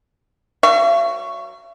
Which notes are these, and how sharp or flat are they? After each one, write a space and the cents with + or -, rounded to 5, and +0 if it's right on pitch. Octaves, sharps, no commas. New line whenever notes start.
F#3 +0 E5 +45 C#6 +0